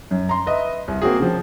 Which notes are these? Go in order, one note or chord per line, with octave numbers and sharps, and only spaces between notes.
F#2
A#5 C6
B4 D#5 E5
C2
A#3 C4 F#4 G#4
C#3 F3